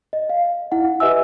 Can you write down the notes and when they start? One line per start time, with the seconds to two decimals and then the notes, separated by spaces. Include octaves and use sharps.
0.13 D#5
0.29 F5
0.72 E4 F#5
1.00 G4 B4 D#5 E5 G#5 E6